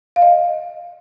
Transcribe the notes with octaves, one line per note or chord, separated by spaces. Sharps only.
F5
D#5